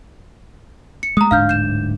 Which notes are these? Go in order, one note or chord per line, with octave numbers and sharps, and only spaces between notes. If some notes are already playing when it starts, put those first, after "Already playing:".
C#7
G#3 A3 A#5 D#6
D1 G#2 D4 F5 F6 G6
G6 E7